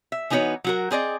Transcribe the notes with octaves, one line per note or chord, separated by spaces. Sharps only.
E5
E3 B3 D#4 F#4 A#4 C#5
F#3 F#4 A#4
C4 G#4 D5 D#5